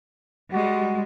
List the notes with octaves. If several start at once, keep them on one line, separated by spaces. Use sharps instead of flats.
G3 G#3 F#4